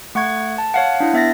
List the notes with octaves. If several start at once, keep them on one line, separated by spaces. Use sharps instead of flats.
A3 F#5 C#6 G#6
A5
C#5 F5 F#5
D4 E4
B3 E5 A6 A#6